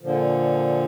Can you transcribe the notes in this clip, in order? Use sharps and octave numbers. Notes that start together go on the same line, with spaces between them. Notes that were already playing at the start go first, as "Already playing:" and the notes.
A#2 D3 F3